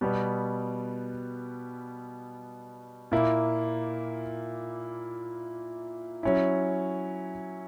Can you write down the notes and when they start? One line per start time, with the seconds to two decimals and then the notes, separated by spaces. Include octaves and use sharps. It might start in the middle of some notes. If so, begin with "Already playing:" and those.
0.01 B2 G3 B3
3.12 A#2 A#3 E4
6.23 F#3 C#4 E4